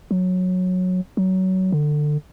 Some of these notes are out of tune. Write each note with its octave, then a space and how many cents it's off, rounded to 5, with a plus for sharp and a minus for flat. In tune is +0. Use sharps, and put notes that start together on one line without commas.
F#3 -15
F#3 +20
D3 +20